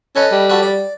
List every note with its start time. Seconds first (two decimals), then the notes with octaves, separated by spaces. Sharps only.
0.16 C#4 A4 B4 D#5
0.31 G3
0.49 F#4 A4 B4
0.63 D5